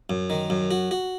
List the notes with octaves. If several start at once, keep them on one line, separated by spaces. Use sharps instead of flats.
F#2
D#3
F#2
F#4
F#4